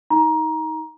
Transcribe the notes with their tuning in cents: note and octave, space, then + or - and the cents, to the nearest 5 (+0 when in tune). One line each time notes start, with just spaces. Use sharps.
D#4 +25 A#5 +20